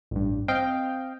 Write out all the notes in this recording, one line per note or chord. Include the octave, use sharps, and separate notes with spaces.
A1 G2
C4 D#5 F5 G5